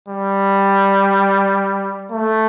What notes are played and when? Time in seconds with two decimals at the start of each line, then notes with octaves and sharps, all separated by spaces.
0.08 G3
2.11 A3